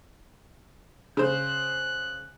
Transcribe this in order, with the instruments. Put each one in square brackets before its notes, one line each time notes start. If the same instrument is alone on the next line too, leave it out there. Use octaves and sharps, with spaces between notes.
[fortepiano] C#3 C5 [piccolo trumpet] F#6